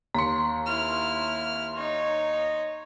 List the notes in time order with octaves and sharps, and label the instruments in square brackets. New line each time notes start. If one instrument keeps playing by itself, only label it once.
[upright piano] D#2 [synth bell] A#5 C6
[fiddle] E4 F6
D#4 C#5